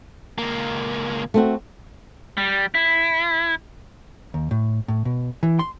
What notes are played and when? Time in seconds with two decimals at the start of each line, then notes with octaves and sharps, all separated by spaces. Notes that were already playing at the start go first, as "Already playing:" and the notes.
0.38 C#2 A#3
1.34 A3 C4 F#4
2.37 G3
2.75 E4
4.34 D#2
4.51 A2
4.88 A2
5.05 B2
5.43 E3
5.59 C6